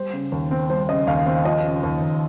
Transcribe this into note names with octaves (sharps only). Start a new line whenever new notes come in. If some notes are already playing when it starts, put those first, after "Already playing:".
Already playing: G3 C5
C#3
D#2
C4
G3 C5
C#3 D#5
D#2 F5
C4 F5
F3 D#5
C#3
D#2
D#2